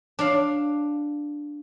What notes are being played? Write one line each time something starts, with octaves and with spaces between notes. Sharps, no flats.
D4 D5 F5